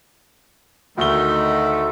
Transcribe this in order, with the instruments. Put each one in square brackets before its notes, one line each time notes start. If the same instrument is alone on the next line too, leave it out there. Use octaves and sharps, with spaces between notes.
[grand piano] D2 G7 [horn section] D#3 [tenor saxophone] A3